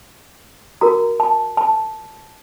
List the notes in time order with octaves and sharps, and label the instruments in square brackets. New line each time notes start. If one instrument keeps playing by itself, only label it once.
[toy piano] F#4 A#4 A#5
A5
A5